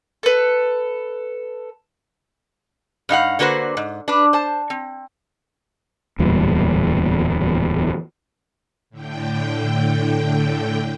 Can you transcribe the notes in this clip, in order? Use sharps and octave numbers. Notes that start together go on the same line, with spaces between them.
A4 B4
G2 D#4 F5 F#5
D3 A#3 F#4 B4 C5
G#2
D4 B4
C5 A5
C4
D1 E2 A#2 G3
A2 D3 G5